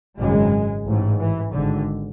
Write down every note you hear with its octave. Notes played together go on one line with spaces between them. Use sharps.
G#1 F#2 C#3 G#3
A1 G#2
E3
G#1 G#2 D3